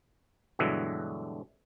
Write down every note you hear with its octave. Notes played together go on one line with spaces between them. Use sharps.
G2 B2 D3 E3 F#3 G#3